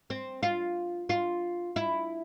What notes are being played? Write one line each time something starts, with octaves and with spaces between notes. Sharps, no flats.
C4
F4
F4
E4